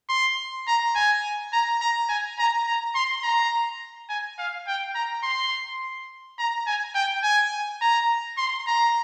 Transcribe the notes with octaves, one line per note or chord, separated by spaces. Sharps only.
C6
A#5
G#5
A#5
A#5
G#5
A#5
A#5
C6
A#5
G#5
F5
G5
A#5
C6
A#5
G#5
G5
G#5
A#5
C6
A#5